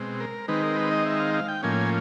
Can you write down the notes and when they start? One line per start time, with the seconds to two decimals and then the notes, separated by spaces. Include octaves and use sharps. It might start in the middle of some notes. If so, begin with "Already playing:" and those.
Already playing: B2 G#3 C4
0.20 A#4
0.48 D#3 G#3 C4 D#4 B4
0.63 A#4
0.76 B4
0.91 D#5
1.06 E5
1.20 F5
1.34 F5
1.48 G5
1.63 A2 F3 A#3 C#4 G#5